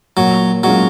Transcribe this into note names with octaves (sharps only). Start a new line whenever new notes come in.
A#2 F#3
F#3 G#3 C#4 F4